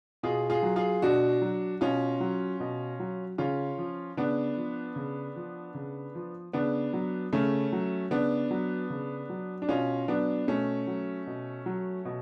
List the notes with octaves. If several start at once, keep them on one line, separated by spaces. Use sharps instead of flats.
B2 F4 G#4
F4 G#4
F#3
F4 G#4
B2 D4 F#4
F#3
B2 C#4 F4
F#3
B2
F#3
C#3 C#4 F4
F3
C#3 B3 D4
F3
C#3
F3
C#3
F3
C#3 B3 D4
F#3
C#3 A3 C#4
F#3
C#3 B3 D4
F#3
C#3
F#3
D4
B2 C#4 F4
F#3 B3 D4
B2 A3 C#4
F#3
B2
F#3
B2